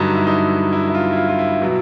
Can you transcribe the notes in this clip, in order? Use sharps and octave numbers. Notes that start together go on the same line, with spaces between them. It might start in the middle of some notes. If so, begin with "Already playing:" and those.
Already playing: G2 D3 F#3 D#4
E4
D#4
E4
E4
F4
E4
F4
F4
E4
B2 F#3 E4